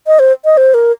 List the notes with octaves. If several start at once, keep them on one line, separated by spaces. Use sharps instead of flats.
D#5
C5
D#5
C5
A#4